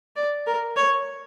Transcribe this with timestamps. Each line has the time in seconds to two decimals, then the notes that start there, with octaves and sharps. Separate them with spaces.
0.16 D5
0.47 A#4
0.76 C#5